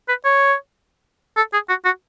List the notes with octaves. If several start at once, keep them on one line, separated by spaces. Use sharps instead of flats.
B4
C#5
A4
G#4
F#4
F#4